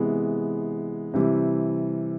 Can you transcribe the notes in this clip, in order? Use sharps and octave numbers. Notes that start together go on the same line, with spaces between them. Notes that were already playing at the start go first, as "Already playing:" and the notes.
Already playing: C3 E3 G#3 B3
C3 E3 G3